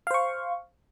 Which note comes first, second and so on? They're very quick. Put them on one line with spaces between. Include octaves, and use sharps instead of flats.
F5 C5 C#6